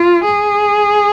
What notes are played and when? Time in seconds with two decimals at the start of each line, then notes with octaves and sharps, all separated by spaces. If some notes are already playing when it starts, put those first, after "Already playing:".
Already playing: F4
0.25 G#4